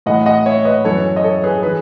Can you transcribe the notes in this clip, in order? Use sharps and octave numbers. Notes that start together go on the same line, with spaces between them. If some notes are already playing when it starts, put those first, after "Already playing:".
A2 E3 D#5 F#5
D#5 F#5
C#5 E5
B4 D#5
F#2 E3 A4 C#5
D#5
A4 C#5
G#4 B4
E3 G#4 B4